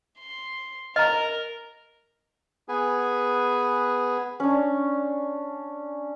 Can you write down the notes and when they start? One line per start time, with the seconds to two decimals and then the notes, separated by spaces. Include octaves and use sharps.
0.19 C6
0.96 A#4 D#5 A#5 F6
2.68 B3 G#4 B4 G#5
4.40 C#4 D4